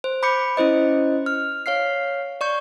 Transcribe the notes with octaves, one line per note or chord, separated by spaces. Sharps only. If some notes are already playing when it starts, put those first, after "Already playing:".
C5
B5 D6 G6 C#7
C#4 E4 C5 D#5
F6
C#5 F5 F6 C7
D5 C#6 G6